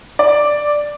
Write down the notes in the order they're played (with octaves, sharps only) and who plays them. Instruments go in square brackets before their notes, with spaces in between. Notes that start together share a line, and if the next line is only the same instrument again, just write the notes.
[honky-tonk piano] D5